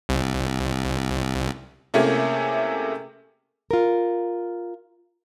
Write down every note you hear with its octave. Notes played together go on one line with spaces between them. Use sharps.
C2
C3 A3 A#3 C#4 E4 G#4
F4 A#4